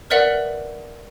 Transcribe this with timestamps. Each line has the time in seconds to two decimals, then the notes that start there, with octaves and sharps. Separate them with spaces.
0.10 A#4 B4 D5 E5 F#5 F#7